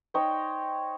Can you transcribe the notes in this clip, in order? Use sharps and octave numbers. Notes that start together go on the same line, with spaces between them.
D#4 C5 C#5 G5